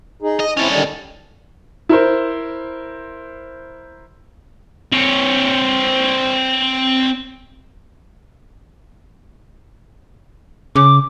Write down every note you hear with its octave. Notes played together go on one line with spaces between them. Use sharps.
D#4 G#4
D#5
C4 C#4 E4 A4
D3 D#3 G3
E4 A#4 C5
C4 C#5
C#3 D6